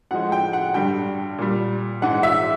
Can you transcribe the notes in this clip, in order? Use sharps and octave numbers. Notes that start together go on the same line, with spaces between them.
A2 F3 G#3 F#5
G5
F#5
G2 D3 G3 G5
A#2 G3
G#2 E3 G#3 F#5
E5